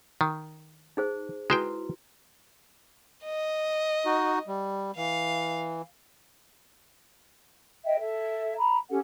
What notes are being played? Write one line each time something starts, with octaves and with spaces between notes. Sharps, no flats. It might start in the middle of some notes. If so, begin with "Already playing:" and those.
D#3
D#4 G#4 C5
G#3 E4 F#4 B4 C5 G5
D#5
D#4 F#4
G3
E3 F5
D#5 E5 G5
A4 E5
A#5 B5
C#4 G4 A4 F#5